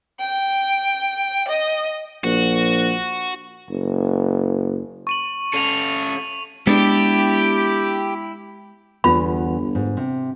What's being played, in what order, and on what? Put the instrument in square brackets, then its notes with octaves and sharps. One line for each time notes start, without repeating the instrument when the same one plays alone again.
[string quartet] G5
D#5
[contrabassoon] A#1 [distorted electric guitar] F#4
[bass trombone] F#1
[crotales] C#6 D#7 F#7
[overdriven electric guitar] C#4 A4 [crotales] D#7 F7
[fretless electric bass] G#3 [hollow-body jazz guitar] B3 D4 [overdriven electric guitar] E4 [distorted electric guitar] G4
[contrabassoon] G1 [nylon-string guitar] E2 B3 [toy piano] F4 B5
[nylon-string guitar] G#2
C3